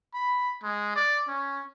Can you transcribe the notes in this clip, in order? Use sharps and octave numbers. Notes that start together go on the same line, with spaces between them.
B5
G#3
D5
C#4